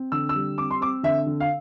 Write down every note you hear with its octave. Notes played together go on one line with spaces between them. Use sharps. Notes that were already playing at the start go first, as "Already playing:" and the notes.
Already playing: C4
D3 E6
E6
G3
C4 D6
C6
C4 D6
D3 E5
D3
F5